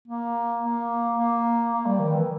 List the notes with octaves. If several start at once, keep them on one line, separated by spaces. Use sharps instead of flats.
A#3
A#3
A#3
A#3
G3
D#3
E3